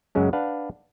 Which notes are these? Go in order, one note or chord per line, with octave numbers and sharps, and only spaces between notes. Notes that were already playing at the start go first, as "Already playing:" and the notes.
F#2 C#3 F#3 G#3 C#4
D4 B4 F5 F#5